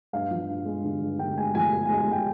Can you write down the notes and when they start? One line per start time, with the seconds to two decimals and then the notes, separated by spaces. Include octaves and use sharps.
0.13 G2 F5
0.31 F3
0.48 G2
0.66 G#3
0.84 D3
1.01 G2
1.19 D3 G5
1.37 G#3 G#5
1.55 F3 G#5
1.73 G#3
1.86 G#5
1.90 G#3
1.98 G#5
2.08 G#3 G5